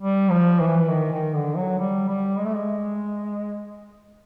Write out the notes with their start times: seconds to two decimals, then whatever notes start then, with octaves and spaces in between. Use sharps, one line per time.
0.01 G3
0.30 F3
0.60 E3
0.89 D#3
1.12 D#3
1.34 D3
1.56 F#3
1.79 G3
2.08 G3
2.38 G#3
2.46 A3
2.54 G#3